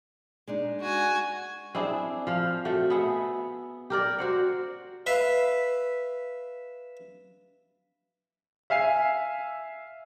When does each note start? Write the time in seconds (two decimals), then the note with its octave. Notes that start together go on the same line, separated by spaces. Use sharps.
0.47 G#3 D4 D#4
0.81 F#4 G#5
1.75 C4 D4 E4 G#4
2.27 F3 C5 F5
2.65 A3 F#4 G5
2.90 B3 G#4 E5
3.90 G4 A#4 D5
4.18 F#4 C5 F#5
5.06 B4 E5 F5
8.70 E5 F5 G#5 C7